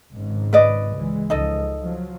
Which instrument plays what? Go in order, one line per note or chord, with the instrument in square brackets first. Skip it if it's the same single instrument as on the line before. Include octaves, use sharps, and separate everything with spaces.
[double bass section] G#1 G#2 C#3
[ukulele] B4 D5 D#5
[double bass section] C#2 E3 G#3
[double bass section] C#2 F3 [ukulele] D#4 A4 D#5
[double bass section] F3 F#3